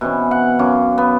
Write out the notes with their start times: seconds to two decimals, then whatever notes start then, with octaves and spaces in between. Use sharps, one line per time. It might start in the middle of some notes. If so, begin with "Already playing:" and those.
0.01 B2 E3 C4 C#4
0.31 F#5
0.59 F#2 C#4 F5 D6
0.98 B3